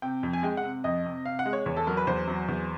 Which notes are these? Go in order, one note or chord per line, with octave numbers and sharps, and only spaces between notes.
C3 G5
F2
G#5
G#3 G5
F#5
C3
F2 D#5
C3
C3 F5
F#5
G#3
C#5
E2 C#5
A4
F#3 A#4
B4
E2 C5
F#3
E2